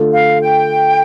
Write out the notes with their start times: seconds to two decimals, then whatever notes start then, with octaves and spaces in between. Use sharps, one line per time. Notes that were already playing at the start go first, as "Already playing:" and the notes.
Already playing: D3 A3 F4
0.12 F5
0.40 G5